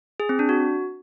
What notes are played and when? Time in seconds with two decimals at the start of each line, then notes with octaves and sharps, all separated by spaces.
0.20 G#4
0.29 C4
0.39 D4
0.49 F#4